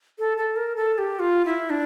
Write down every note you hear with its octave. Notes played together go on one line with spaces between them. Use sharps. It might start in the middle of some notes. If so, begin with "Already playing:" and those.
A4
A4
A#4
A4
A4
G4
F4
E4
D4